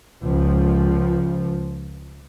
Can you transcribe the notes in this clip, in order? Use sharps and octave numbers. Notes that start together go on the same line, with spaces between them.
C#2 F3